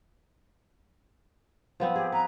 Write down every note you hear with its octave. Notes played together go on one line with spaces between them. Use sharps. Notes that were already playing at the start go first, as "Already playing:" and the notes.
F3 B3 C4
G4 G#4
B4 A#5